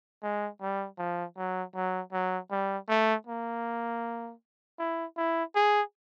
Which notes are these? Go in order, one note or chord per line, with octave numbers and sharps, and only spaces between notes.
G#3
G3
F3
F#3
F#3
F#3
G3
A3
A#3
E4
E4
G#4